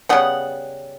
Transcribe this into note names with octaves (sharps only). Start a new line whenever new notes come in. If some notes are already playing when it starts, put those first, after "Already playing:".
C#3 G3 B3 F#5